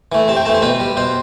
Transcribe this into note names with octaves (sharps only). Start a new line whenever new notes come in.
E3 A3
C3 A5
G5
E3 A3 A5
C5
B2 B4
G3
B2 C5